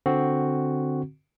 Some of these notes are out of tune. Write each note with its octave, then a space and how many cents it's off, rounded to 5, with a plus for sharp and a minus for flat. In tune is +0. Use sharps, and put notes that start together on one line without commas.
D3 +0 C4 +0 F#4 +0